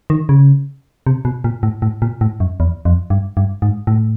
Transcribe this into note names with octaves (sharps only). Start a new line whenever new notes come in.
D#3
C#3
C3
B2
A#2
A2
A2
A#2
A2
F#2
E2
F2
G2
G2
G#2
A2